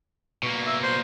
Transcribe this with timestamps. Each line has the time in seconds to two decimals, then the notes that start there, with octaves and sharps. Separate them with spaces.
0.43 B2 A#3
0.67 E5
0.83 C5